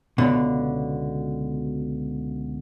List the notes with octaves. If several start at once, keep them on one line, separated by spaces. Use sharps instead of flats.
C#2 B2 D3